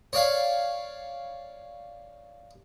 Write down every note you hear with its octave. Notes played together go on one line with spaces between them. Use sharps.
C#5 D5 F5